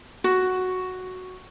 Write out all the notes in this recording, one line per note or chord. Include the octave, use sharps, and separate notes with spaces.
F#4